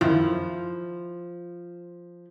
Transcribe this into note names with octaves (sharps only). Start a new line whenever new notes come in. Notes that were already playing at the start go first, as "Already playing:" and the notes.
F#2 D#3 F3 E4 F4